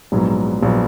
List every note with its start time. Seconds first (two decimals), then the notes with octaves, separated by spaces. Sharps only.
0.12 A#1 G#2 F#3 B3
0.62 A#1 F#3 B3